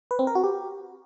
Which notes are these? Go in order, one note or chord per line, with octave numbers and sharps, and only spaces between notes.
B4
C4
A#4
F#4
G4